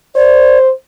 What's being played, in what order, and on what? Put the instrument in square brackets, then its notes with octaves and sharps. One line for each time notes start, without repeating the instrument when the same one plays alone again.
[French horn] C5 [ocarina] D5